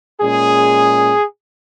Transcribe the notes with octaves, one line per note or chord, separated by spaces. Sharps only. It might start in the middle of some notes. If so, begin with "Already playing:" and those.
A#2 G#3 C#4 G#4